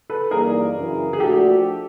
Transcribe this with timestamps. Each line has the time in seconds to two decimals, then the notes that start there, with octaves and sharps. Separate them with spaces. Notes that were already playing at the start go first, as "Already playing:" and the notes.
0.10 A4 B4
0.31 G2 E3 G3 A#3 D#4 G#4 A#4
0.76 F#2 C#3 E3
1.13 G#4
1.20 A#2 F3 A3 D4 F#4 G4 A4